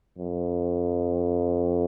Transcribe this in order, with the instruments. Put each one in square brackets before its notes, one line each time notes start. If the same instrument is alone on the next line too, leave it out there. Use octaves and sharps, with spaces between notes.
[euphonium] F2